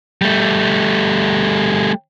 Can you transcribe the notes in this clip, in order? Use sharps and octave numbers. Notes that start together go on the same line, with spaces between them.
G3 A3